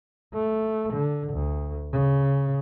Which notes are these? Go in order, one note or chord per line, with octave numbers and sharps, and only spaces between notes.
A3
D3
D2
C#3